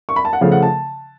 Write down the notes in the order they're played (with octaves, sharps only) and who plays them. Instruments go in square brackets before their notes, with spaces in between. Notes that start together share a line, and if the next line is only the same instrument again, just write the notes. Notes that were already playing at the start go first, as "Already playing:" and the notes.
[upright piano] C#6
B5
A5
F#5
[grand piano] C#3 F3 A3 [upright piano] F5
[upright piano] F#5
A5